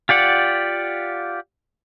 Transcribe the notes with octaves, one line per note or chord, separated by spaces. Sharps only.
F4 G4 D5 F#5